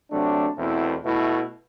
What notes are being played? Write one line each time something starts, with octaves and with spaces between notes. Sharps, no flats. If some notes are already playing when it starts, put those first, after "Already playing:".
C3 F#3 A3 D4
E2 B2 A3 C4 E4
B2 A3 E4